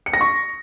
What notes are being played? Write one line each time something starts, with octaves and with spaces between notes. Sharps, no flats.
C#7
A#6
C#6